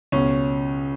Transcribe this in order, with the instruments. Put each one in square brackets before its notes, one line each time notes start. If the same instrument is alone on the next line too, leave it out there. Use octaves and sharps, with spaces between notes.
[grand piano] C#2 B2 C#4